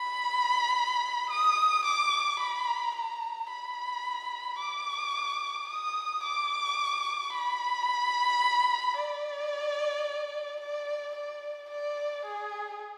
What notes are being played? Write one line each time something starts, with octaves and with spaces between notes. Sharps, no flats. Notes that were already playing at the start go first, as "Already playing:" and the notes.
Already playing: B5
D#6
D6
B5
A#5
B5
D6
D#6
D6
B5
D5
D5
D5
D5
G#4